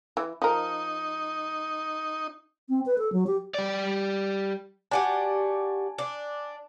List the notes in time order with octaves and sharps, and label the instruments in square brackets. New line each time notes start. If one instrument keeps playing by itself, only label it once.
[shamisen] E3
[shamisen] F3 A#4 [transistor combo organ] D#4
[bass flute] C4
B4
A4
F#3
G4
[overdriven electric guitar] G3 D5
[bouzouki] D4 F#4 G4 [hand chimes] G#5 A5
[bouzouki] D4